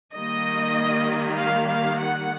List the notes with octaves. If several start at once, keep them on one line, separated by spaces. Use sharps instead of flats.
D#3 G3 A#3 D#5
F5
F5
F#5